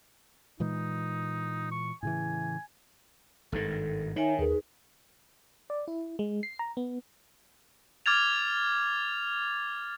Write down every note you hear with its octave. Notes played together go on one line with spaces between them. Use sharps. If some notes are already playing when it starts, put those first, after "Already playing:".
A#2 E3 G#3 D#4
C#6
A2 C#3 E3 G#5
G#1 G2 D#3 A4
D#3 D#4 C#5 E5 G#5
D#2 D#4 G#4 A#4 B4
D5
E4
G#3
C7
A#5
B3
D6 F6 G#6 A6 F7